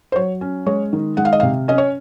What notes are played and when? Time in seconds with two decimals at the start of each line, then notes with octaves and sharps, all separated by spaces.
0.12 C5
0.16 F#3 C#5
0.41 C#4
0.66 G#3 C#5
0.93 D#3
1.17 G#3 F#5
1.25 F5
1.33 D#5
1.40 C3 F5
1.68 C#4 D#5
1.78 C#5